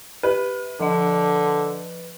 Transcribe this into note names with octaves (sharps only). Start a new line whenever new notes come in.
G4 B4
D3 F3 D#5